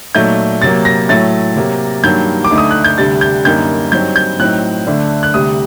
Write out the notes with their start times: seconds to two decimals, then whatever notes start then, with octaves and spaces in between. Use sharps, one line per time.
0.15 A#2 F#3 A3 D#4 G6
0.62 C3 F#3 A#3 A6
0.85 A#6
1.09 A2 F#3 A3 A6
1.56 C3 F#3 A#3
2.04 G2 D#3 F#3 A#3 G6
2.44 D6
2.51 D2 D3 A3 D#4
2.58 D#6
2.71 F#6
2.84 G6
2.98 D2 C3 G3 D4 A6
3.21 G6
3.45 F#2 D3 G3 A#3 D#4 G6
3.92 G2 F#3 C4 D#4 G6
4.16 G6
4.39 A2 F#3 C4 D#4 F#6
4.87 D2 D3 A3 D4
5.23 F#6
5.34 D2 C3 G3 D#6